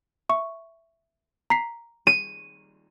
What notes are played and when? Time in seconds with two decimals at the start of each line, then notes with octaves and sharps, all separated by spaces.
0.29 E5 C#6
1.50 A#5 B6 C7
2.07 D#7